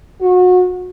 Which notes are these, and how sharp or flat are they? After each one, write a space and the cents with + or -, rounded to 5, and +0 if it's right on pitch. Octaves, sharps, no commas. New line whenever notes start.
F#4 -30